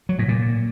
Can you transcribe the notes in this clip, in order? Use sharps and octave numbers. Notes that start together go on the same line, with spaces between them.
F#3
A2
A#2